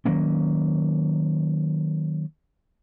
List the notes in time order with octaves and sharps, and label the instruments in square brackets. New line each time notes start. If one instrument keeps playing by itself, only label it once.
[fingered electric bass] D#3 F#3 A#3 C#4